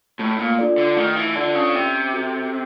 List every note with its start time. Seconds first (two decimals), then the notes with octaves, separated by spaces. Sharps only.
0.19 A2 A3
0.39 A#2
0.59 D4 F4 A4 D5
0.78 D3
0.97 D#3 A3
1.16 E3
1.35 D3 D4 F4 A4 D5
1.55 C#3
1.74 C3 C#4
2.13 F#4 A4